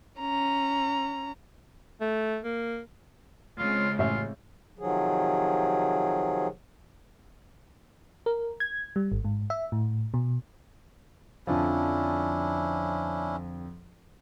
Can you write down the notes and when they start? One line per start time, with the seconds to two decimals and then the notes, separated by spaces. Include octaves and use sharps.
0.20 C#4 A#5
2.01 A3
2.44 A#3
3.58 C#3 G#3 C4 F4
3.98 A1 F4 E5
4.79 C3 D#3 F3 F#3 G#4
8.26 A#4
8.60 G#6
8.96 G3
9.12 G#1
9.24 G#2
9.50 E5
9.72 A2
10.14 B2
11.47 F2 D3 F3 C#4 D4 E4